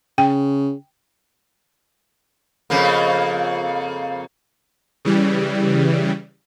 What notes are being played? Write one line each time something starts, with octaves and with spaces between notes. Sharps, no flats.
C#3 G5
F2 C#3 A#3
C#3 E3 G3